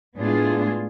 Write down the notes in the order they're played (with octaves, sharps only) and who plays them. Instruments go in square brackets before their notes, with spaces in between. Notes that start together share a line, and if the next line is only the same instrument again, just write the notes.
[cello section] A2 G#3 B3 D4 F4 G#4